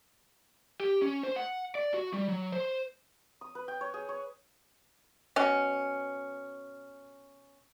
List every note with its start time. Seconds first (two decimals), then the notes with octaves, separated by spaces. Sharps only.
0.80 G4
1.01 C#4
1.23 C5
1.36 F#5
1.75 D5
1.94 F#4
2.13 G3
2.28 F#3
2.52 C5
3.41 D#6
3.55 B4
3.68 G5
3.81 C#5
3.94 G#4
4.09 C#5
5.36 B2 C#4